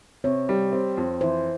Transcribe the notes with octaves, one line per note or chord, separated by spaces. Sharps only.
C3 C#5
G3
C4
F2
E3 C5